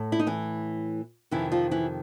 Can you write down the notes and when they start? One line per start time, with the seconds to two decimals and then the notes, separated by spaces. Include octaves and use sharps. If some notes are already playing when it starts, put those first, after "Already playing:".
Already playing: A2 A3
0.12 E4
0.19 D#4
0.27 E3 E4
1.31 F2 C3 D#3 E3 E4
1.52 F3 F4
1.71 E3 E4